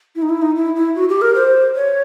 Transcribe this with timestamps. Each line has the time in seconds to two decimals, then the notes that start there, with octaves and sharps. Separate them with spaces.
0.16 E4
0.22 D#4
0.29 E4
0.42 D#4
0.56 E4
0.76 E4
0.95 F#4
1.09 G4
1.22 A#4
1.35 C5
1.75 C#5